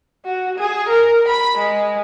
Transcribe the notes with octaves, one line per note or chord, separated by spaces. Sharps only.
F#4
G#4
A#4
B5
G#3